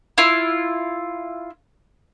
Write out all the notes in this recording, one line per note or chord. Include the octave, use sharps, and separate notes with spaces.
E4 F4